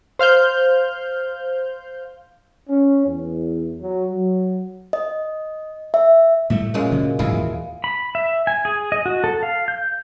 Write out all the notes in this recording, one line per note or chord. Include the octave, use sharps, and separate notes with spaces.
C5 F5 F6 G6
C#4
E2
F#3
F#3
D#5
E5
A2 G3 A3 E5
F#2 A#2 G#3
D2 C#3
D1 G#2 C3 E4 F4 G#4
D#2 E3
B5
E5
G#5
G#4
D#5
F#4
A4
F5
G6